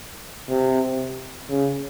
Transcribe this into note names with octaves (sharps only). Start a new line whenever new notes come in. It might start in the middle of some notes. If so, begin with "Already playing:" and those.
C3
C#3